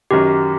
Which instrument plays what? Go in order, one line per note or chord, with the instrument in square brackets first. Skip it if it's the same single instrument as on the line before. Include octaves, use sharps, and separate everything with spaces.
[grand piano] F#2 D#3 F#3 [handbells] G4